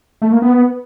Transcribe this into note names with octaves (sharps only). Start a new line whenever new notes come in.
A3
A#3
B3